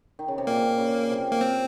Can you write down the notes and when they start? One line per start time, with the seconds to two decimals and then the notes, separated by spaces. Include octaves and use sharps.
0.19 D#3
0.28 C#3
0.38 C3
0.47 A#2 A#3
0.78 C#3
1.10 C3
1.32 A#3
1.41 C4